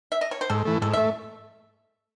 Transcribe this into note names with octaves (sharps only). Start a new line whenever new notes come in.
E5
D#5
C#5
C5
G#2 A4
E3 A3
G#2 A4
E5
A3